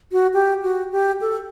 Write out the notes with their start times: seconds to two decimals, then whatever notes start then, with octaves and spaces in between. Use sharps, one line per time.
0.12 F#4
0.34 G4
0.63 F#4
0.92 G4
1.21 A4